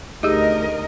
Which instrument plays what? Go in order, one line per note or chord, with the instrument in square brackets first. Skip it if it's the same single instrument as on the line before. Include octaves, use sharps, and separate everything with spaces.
[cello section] D2 A#4 D#5 [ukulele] D#4 [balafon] G4 G#4